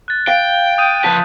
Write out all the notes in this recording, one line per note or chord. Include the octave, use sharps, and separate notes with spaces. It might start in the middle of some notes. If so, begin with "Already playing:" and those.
F#6 A6
F5 G5
D#6 G6 D#7
F3 B4 A5